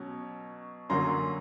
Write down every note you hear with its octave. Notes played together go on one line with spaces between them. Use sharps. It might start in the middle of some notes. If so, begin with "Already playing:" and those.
Already playing: B2 F#3 C#4
F#2 D3 F#3 A#3 C#4 A#5 C6